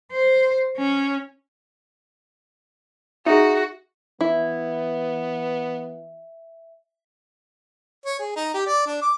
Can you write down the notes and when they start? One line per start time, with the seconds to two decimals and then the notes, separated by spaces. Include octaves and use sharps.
0.12 C5
0.77 C#4
3.26 D#4 F#4 G#4 E5
4.21 E3 B3 E4 E5
8.05 C#5
8.19 G#4
8.36 D#4
8.54 G4
8.67 D5
8.86 D4
9.02 D6